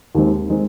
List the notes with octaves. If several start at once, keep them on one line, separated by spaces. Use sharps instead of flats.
D#2 D#3 G#3 C4 D#4
D#3 G#3 C4 D#4